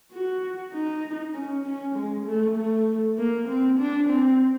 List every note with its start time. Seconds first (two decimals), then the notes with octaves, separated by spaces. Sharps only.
0.12 F#4
0.73 D#4
1.34 C#4
1.65 C#4
1.96 G#3
2.26 A3
2.56 A3
3.18 A#3
3.48 C4
3.79 D4
4.09 C4